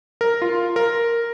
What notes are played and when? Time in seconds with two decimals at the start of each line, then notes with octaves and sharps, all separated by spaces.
0.21 A#4
0.42 F4
0.76 A#4